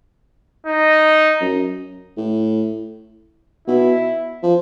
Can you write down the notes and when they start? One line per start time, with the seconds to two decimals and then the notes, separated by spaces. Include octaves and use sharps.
0.66 D#4
1.41 F#2
2.17 A2
3.68 B2 E4
4.43 F3